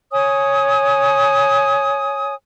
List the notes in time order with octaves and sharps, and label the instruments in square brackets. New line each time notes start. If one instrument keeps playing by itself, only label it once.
[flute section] C#5 G#5 D#6